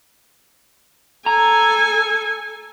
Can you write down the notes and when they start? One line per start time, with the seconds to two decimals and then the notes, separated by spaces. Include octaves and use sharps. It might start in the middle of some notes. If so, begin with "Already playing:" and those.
1.26 A4 G#5 A#5